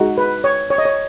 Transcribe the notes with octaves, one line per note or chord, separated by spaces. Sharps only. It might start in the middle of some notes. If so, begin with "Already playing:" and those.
Already playing: G#3 D#4 F#4
B4
C#5
C#5
D#5
C#5